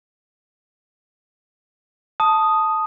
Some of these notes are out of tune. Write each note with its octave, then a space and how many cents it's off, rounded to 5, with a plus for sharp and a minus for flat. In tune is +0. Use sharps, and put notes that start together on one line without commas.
A5 +0 D#6 +0